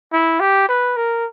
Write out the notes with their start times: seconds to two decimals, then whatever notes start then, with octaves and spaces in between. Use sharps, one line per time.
0.13 E4
0.40 G4
0.69 B4
0.96 A#4